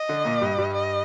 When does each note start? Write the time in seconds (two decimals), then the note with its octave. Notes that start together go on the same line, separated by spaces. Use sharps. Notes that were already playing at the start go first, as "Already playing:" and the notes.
Already playing: D#5
0.09 D3 D4
0.25 A#2 A#3
0.41 G2 G3
0.58 G2 G3
0.74 D#5